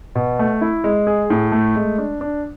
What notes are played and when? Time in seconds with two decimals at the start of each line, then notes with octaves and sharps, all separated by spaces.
0.15 B2
0.39 A3
0.61 E4
0.84 G#3
1.07 G#4
1.30 A2
1.52 A3
1.76 G#3
1.98 D4
2.21 D4